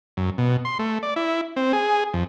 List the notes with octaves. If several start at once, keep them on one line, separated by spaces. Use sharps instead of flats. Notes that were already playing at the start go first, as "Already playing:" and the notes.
F#2
B2
C6
A3
D5
E4
C4
G#4
F2